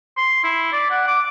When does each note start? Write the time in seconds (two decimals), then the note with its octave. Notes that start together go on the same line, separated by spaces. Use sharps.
0.17 C6
0.44 E4
0.72 D5
0.90 F#5
1.07 D6